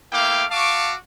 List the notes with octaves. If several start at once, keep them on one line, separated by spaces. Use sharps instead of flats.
A3 A#3 E4 F5 G5 D6
F#4 F5 A5 C#6 D6